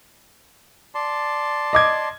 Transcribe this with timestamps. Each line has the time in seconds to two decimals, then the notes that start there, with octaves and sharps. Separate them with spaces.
0.95 D5 A5 C6
1.73 D#5 D6 G#6